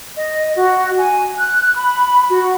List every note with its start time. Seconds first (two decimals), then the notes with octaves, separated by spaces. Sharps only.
0.17 D#5
0.56 F#4
0.97 G#5
1.38 F#6
1.76 B5
2.29 F#4